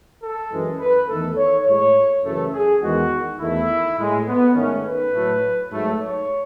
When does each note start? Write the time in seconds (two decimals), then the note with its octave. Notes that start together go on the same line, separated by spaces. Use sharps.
0.21 A4
0.50 F#2 E3 G#3
0.79 B4
1.08 E2 D#3 A3 A4
1.37 C#5
1.66 A2 G#3 C#5
2.23 F#2 C#3 E3 A3 A4
2.53 G#4
2.81 E2 D#3 G#3 F#4
3.39 E2 D#3 A3 E4
3.97 A2 G#3
4.26 B3
4.54 G#2 D#3 A3 C#4
4.84 B4
5.12 A2 F#3 A3
5.70 G#2 F#3 A3
5.99 C#5